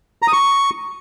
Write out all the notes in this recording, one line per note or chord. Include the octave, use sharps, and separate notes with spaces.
A#5
D#6
C#6